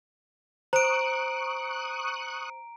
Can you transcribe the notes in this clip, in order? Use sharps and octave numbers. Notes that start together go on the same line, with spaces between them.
C5 A#5 C#6 D#6 F#6 D7